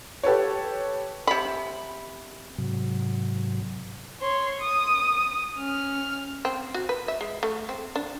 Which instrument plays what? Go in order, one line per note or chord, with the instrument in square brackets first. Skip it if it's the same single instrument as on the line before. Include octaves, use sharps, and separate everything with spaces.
[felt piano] G4 A4 B4 C#5
[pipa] C3 B5
[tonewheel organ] G#2 C3 F#3
[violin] C#5 C6
D#6
C#4 F6
[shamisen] C4
F#4
B4
E5
G#3
A3
C4
D4